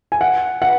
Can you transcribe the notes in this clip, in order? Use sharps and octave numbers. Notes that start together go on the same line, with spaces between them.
G#5
F#5
F#5